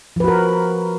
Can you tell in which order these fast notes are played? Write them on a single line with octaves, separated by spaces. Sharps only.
F3 B4 F#4 A#4